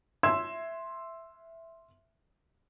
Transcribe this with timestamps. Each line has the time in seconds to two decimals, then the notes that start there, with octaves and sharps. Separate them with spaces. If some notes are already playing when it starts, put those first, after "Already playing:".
0.23 E5 C6 E6 G#6 E7